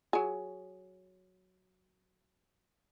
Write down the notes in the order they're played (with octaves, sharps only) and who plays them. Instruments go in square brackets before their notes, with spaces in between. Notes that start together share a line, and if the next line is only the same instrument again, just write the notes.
[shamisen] F#3 G#4